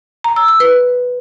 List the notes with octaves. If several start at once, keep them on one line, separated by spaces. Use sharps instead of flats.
A#5
E6
E6
B4